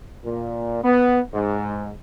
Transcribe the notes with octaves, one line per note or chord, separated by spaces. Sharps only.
A#2
B3
G#2